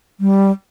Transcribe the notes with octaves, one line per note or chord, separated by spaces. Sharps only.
G3